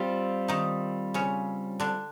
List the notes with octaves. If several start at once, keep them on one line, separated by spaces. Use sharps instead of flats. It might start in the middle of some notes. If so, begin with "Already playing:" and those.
Already playing: G3 C4 F4
D#3 D#4
C#3 C#4
D3 D4